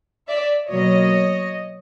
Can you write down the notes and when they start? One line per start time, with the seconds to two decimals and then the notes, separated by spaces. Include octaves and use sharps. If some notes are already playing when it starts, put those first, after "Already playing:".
0.28 D5 E5
0.69 B2 F#3 A#3 C#5 D#5